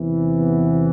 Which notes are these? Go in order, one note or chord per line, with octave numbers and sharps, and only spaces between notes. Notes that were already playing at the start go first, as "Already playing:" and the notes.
Already playing: E2 C3 E3
B3